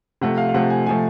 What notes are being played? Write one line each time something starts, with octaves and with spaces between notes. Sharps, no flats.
C3 F3 A3 F#5
F5
F5
C3 F3 A3 F#5
G#5
C3 F3 A3 G#5